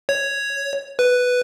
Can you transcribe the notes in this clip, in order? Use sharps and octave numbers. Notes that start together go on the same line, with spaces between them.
C#5
B4